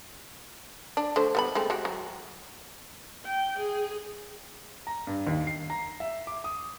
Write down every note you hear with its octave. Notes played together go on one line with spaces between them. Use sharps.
D4
D3 A3 C5
G3 B3 B5
G#3 A3 C4
G#3 F#4 G4
F#3
G5
G#4
A#5
G2
D#2
C7
A#5
E5
D6
D#6